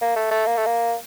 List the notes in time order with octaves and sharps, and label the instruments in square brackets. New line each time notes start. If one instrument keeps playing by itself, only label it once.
[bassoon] A#3
A3
A3
A#3
A3
A#3